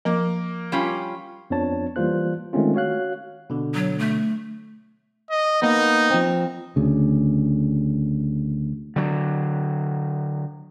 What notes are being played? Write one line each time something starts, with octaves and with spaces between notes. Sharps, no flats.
F3 A#3 A#4
G3 C#4 F4
F2 F3 B3 D4 C#5 A5
E3 G3 A#3 F4 C5 F#6
D#3 G#3 A3 C4 C#4 F4
F#4 C#5 F5 F#6
B2 D3
F#3
A3
D#5
A#3 B3 D#4
F3 C4
D2 C#3
D3 F#3